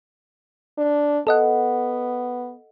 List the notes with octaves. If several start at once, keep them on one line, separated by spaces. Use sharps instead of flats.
D4
B3 A4 D#5 F#5